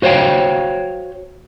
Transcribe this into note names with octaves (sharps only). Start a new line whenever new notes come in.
F#4 C5 C#5 F5 G5